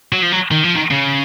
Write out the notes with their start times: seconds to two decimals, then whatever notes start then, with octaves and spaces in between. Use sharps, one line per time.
0.13 F#3
0.23 F3
0.32 F#3
0.51 D#3
0.64 F3
0.75 D#3
0.91 C#3